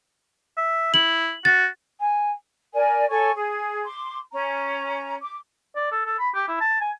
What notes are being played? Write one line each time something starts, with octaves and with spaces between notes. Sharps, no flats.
E5
E4 F#7
F#4 A6
G#5
A#4 D5 G#5
A4 C#5 G#5 C#6
G#4
C6 D6
C#4 A#5
D6
D5
A4
A4
B5
G4
E4
A5
G#5